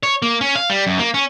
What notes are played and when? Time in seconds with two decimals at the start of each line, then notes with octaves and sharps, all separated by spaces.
0.03 C#5
0.22 A#3
0.41 C#4
0.55 F5
0.70 G3
0.87 F#2
0.99 A#3
1.14 C#4